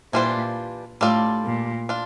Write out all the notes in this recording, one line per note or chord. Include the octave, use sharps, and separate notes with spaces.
A#2 E3 G3 D4 F4 C5
A2 G3 D4 F4 A4 D5
A#2
D4 F4